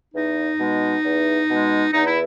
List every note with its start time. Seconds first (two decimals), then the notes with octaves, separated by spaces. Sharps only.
0.14 E2 D#4
0.59 B2 G#3
1.04 E2
1.49 B2 G#3
1.93 E2 D#4
2.07 E4